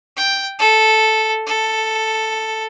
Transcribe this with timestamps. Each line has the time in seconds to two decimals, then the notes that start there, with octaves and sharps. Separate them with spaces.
0.17 G5
0.59 A4
1.46 A4